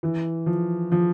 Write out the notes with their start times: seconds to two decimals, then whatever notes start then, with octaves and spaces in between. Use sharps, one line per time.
0.03 E3
0.46 F3
0.92 F3